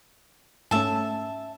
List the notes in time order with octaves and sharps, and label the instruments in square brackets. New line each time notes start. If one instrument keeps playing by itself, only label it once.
[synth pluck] G#2 A3 C#4 [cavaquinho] E5 A5